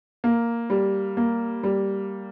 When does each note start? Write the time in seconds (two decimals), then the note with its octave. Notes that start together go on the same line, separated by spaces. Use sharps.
0.24 A#3
0.70 G3
1.17 A#3
1.63 G3